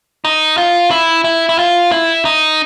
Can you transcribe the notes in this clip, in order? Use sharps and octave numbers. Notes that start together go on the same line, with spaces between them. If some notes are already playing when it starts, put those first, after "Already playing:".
D#4
F4
E4
E4
E4
F4
E4
D#4